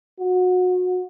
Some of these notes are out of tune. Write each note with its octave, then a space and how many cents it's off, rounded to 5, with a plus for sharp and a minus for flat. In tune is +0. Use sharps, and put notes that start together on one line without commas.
F#4 -25